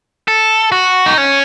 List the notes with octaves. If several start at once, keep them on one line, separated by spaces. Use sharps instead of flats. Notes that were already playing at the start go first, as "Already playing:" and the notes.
A4
F#4
D#4
C#4